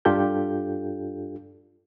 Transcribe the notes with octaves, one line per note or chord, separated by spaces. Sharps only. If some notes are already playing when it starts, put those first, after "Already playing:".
G2 D4 F4 G4 A4 G6